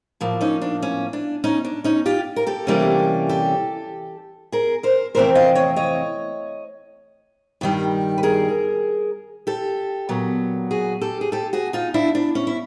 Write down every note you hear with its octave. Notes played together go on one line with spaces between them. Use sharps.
A2 F3 A#3
C#4 D#4
D4
C#4
D4
C#4 D#4
D4
C#4 D#4
F4 G4
A#4
G4 A4
C3 E3 G3 A#3 C#4
G4 A4
G#4 A#4
A#4 C5
F2 C3 E3 A3 C4 A#4 C5
D#5 F5
C#5 D#5
C#5 D#5
G2 D#3 G3
B4
G#4 A#4
G4 A4
A#2 F#3 B3
F#4 G#4
G4 A4
G#4
G4 A4
F#4 G#4
D#4 F4
D4 E4
D4
C#4
E4